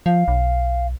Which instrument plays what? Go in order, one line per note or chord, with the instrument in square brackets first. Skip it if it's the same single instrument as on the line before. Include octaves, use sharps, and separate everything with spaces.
[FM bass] F3 [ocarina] F5
[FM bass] B1